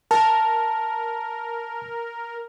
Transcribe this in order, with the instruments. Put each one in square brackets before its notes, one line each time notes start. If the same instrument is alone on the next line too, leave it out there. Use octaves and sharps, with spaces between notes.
[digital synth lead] A#4 [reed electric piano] A5